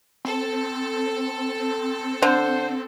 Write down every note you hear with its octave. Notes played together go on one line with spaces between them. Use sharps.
C4 A4
D3 C5